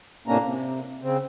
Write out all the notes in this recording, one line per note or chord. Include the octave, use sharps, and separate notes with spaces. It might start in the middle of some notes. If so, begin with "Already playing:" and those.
A2 C3 A#3 C#4 D4 A#5
C3
C#3 C4